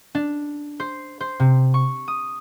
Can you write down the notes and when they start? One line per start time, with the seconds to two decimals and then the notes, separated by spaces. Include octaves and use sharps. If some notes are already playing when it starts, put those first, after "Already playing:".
0.15 D4
0.80 C5
1.20 C5
1.40 C3
1.74 C#6
2.08 D#6